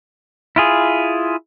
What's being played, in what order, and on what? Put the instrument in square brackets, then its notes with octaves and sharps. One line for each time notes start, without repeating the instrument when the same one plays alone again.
[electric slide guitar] E4 F4 G#4